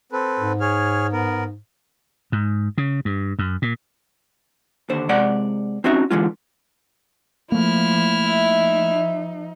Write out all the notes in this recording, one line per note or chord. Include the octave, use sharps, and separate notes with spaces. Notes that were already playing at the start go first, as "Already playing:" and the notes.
C4 A4 B4
G#2
G#4 C#5 F6
B3 A#4
G#2
C#3
G2
F#2
A#2
D#2 D3 C5
C3 G#3 D5 F#5
C4 C#4 D#4 F#4 E5
D3 E3 G#3 F4
F3 A3 A#3 E4 F6
F3 D#4 E5